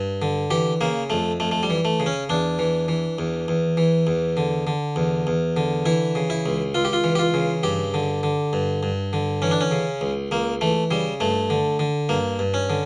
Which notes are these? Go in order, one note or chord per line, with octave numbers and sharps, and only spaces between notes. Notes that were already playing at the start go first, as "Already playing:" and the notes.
Already playing: G2
D3
E3 G4
C#3 A#3
F2 A3
F2 A3
A3
G3
E3
A3
C#3
C#4
E2 D4
E3
E3
E2
E2
E3
E2
D3
D3
E2
E2
D3
E3 E4
C#3
E4
C#2
C#2 F4
G4
F4
E3
G4
F4
C#3
G2 G4
D3
D3
G2
G2
D3
E3 C#4
D4
C#4
C#3
C#2
C#2 A#3
E3 A3
C#3 G3
G2 A3
D3
D3
G2 A#3
G2
C#4
D3